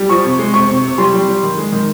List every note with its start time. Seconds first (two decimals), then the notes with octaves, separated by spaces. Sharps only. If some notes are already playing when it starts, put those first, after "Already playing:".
Already playing: G3
0.09 F3 C#6
0.24 C3
0.39 G#3
0.54 C3 C#6
0.68 C3
0.83 C3
0.98 G3 C6
1.13 G3
1.28 G3
1.43 D#3
1.58 G#3
1.72 D#3